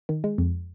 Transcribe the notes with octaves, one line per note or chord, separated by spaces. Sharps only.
D#3
G#3
F2